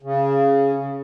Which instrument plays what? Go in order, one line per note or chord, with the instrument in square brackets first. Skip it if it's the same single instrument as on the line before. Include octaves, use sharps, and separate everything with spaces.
[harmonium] C#3